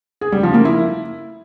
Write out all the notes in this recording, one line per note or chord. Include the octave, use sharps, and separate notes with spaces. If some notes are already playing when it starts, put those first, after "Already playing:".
G#4
G3
F3
A#3
E4